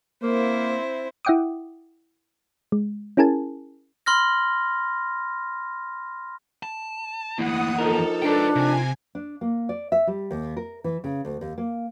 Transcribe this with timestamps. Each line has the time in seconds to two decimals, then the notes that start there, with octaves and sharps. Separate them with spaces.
0.23 A#3 C4 E4 C5
1.25 E4 E5 F#5 G5 D6 D#6
2.72 G#3
3.17 C#4 E4 G#4 A#4 G#5 A5
4.06 B5 C6 F6 A#6
6.63 A5
7.38 E2 A2 A#3 F#5 D#6
7.78 F3 D#4 A4 A#4
8.22 D4 B4 G5
8.56 C3 G#5
9.15 D4
9.41 A#3
9.69 D5
9.92 E5
10.07 G3
10.31 D#2
10.57 A#4
10.84 E3
11.04 C#3
11.25 D2
11.41 D#2
11.58 A#3